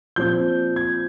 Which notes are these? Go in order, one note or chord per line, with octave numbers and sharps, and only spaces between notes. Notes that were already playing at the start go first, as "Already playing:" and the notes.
A#2 F3 C4 G6
G#6